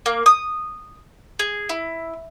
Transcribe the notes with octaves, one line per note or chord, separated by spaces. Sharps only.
A#3
D#6
G#4
E4